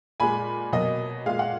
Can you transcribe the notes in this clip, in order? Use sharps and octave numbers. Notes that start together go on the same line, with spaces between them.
A#2 G#3 G#5 B5
B2 F#3 A#3 D#5
A#2 G#3 F5
F#5